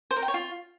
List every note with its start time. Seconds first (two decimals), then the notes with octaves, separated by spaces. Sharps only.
0.11 C5
0.16 A#4
0.22 G5
0.28 C#5
0.34 F4